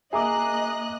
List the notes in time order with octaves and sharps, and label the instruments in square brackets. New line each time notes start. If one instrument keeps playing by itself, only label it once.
[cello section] A#3 [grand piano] G#4 [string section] D#5 F#6 [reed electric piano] E5 A#5 D6